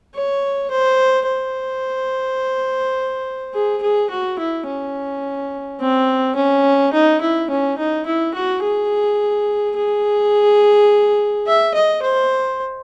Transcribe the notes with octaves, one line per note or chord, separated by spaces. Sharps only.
C#5
C5
C5
G#4
G#4
F#4
E4
C#4
C4
C#4
D#4
E4
C#4
D#4
E4
F#4
G#4
G#4
E5
D#5
C5